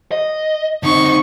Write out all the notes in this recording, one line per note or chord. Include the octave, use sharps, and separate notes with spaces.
D#5
D3 C4 D#4 C#6